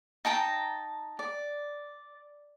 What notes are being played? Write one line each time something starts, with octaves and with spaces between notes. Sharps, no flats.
D#4 G5 A5 A#5
D5